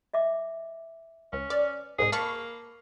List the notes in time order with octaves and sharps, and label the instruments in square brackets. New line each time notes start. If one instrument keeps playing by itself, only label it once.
[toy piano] D#5 E5 D6
[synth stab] C#2 [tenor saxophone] C#4
[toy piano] B4 [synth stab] D5
[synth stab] C2 G#2 [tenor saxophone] G#4
[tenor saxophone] A#3 [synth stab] A5 B5 C#6